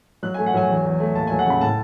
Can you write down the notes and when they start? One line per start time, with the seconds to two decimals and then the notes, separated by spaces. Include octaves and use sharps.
0.23 F#3 F#6
0.34 G#5
0.38 A3
0.46 F#5
0.54 F#3 G#5
0.69 E2
0.85 E2
1.00 A3
1.15 D#2 A5
1.27 G#5
1.31 F#3
1.39 F#5
1.46 C#3 B5
1.61 A2 A5